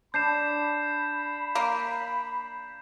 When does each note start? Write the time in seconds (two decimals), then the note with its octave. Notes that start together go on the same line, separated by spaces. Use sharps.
0.14 D4 B5 G6 C7 E7
1.55 A#3